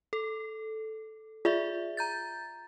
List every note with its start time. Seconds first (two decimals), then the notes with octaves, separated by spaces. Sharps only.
0.13 A4
1.45 F4 G#4 D5 E5
1.97 A#5 G6 A6